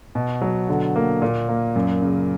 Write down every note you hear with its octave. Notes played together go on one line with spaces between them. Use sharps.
B2
F#3
D3
A#3
A#2
A#3
F#2
C#3